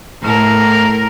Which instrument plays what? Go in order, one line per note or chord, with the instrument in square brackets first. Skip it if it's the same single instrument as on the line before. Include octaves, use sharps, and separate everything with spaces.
[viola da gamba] A2 A#4